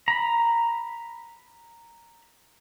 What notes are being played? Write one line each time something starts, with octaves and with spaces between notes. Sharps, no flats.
A#5 B5